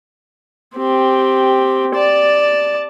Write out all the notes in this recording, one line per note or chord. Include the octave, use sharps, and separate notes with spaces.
C4 G4
D5 A5